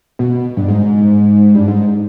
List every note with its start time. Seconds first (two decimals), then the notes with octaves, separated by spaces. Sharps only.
0.19 B2
0.57 G2
0.68 G#2
1.55 G2
1.68 G#2